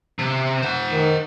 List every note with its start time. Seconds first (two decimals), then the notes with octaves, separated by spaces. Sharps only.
0.19 C3
0.62 C5 F#5
0.92 D#3